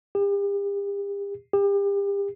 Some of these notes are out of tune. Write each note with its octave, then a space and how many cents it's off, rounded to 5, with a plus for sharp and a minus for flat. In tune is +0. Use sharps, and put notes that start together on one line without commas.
G4 +40
G4 +35